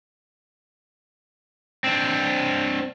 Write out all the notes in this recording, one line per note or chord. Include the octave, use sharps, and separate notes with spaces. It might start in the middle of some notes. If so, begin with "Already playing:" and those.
C4 D4